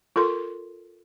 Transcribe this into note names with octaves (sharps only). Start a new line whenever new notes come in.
F4 A4 A#4 C6